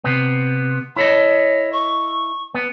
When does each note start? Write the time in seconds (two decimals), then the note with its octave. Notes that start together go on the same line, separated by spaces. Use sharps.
0.04 C3 B3
0.96 E4 A4 C#5 D#5
1.72 C#6
2.54 B3